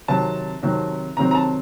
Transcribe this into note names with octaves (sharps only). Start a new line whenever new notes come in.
C3 D#3 F#3 C4 A5
C3 D#3 F#3 C4
C3 D#3 F#3 C4 A#5
A#5
A5